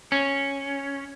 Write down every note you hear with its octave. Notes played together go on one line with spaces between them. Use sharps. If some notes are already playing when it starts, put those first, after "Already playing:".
C#4